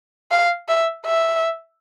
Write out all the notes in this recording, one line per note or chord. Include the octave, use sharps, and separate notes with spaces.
F5
E5
E5